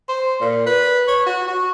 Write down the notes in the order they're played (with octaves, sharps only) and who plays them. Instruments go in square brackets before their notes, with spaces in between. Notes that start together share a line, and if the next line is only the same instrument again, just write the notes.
[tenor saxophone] C5
A#2
B4
C#5
F#4
F#4